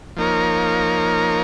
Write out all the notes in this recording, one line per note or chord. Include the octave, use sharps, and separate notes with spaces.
F3 A#3 D#4 A#4 C#5